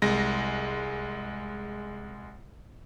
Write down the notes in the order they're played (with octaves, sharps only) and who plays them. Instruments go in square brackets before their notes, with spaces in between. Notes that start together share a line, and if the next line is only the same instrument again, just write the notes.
[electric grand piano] C2 G#3 A#6